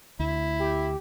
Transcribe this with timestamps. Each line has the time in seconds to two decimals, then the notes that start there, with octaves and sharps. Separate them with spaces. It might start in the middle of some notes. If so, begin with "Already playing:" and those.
0.19 D2 E4
0.60 G4